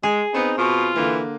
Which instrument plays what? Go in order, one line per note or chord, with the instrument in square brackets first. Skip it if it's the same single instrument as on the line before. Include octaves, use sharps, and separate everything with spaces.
[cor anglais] G#3 [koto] G#4
[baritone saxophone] B3 [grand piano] C4 [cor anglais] D#4
[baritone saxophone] B2 [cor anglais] F4
[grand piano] D3 A#3 [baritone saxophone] E3